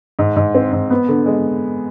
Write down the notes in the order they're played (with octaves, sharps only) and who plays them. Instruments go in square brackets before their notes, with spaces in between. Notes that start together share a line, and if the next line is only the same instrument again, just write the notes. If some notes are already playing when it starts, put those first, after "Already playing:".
[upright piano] G#2
G#2
C4
G#2
B3
D3
G#3